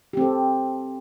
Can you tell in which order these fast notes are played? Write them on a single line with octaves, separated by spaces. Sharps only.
G4 C4 A4